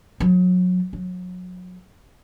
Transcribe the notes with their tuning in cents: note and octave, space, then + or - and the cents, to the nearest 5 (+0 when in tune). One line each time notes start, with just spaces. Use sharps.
F#3 -30
F#3 -30